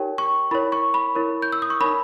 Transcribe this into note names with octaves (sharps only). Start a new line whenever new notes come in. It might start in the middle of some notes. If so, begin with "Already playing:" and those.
Already playing: D#4 G4 A#4 C#5 G5
C#6
E4 A#4 C#5 B5
C#6
B5
E4 A#4 C#5
G6
E6
D#6
C#6
D#4 A#4 C#5 B5